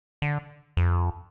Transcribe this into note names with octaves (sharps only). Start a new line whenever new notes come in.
D3
F2